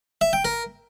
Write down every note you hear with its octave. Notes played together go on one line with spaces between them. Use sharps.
E5
G5
A#4